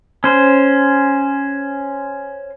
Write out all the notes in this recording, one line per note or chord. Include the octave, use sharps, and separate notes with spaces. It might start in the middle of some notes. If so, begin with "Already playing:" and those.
C#4 C5